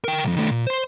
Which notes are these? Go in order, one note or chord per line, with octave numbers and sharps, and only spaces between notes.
A#4 G5
B1 F2
D#3 A3
A#2
C5 C6